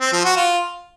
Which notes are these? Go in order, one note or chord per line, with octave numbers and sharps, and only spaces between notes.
C4
F3
F#4
F4